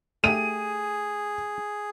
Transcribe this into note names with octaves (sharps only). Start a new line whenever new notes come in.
A3 G4 G#4 D#7